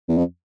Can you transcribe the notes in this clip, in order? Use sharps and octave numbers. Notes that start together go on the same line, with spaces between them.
E2
F2